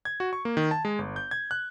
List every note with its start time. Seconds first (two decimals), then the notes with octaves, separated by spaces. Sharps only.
0.05 G#6
0.20 F#4
0.33 C#6
0.45 A#3
0.57 D#3
0.71 A5
0.85 G#3
0.99 G1
1.16 G6
1.31 G#6
1.51 F#6